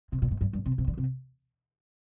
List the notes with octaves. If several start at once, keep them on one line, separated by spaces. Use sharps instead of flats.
C3
A#2
G#2
G2
G2
C3
C3
D3
C3